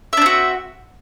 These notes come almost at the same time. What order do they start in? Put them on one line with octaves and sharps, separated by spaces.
E5 D4 C4 F#4